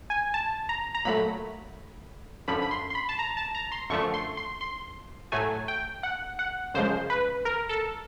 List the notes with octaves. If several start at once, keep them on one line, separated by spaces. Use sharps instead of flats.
G#5
A5
A#5
A#5
A#2 F#3 A3 B5
F#2 D3 F3 B5
B5
C6
C6
B5
A5
A#5
A5
A#5
C6
F#2 D3 F3 A3 C#6
C6
C6
C6
A2 F#3 A3 G#5
G5
F#5
F#5
F#2 C#3 F3 G#3 C5
B4
A#4
A4